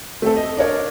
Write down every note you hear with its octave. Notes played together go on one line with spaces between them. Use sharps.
A3 C4 A4
D#5
D4 A#4 C#5 D5